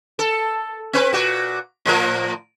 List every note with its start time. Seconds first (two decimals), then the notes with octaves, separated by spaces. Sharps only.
0.19 A4
0.93 C4 B4
1.13 A#2 F#4
1.85 A2 F3 A#4